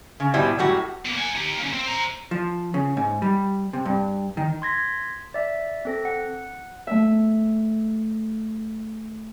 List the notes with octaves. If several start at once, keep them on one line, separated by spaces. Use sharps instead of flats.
C#3
G#2 B2 G3 E4
F#2 A2 G3 F#4
B2 A#3
F#5 G#5
D#4 G4
A#3 C#4
C4
C5 A#5
F3
C#3
G#2
G3
C3
G2
D#3
C6 G#6 A#6 B6
D5 E5
C4 A4 A#6
F#5
A3 E5